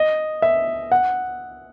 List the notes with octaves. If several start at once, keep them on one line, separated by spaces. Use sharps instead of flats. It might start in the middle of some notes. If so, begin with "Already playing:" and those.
Already playing: D#5
E5
F#5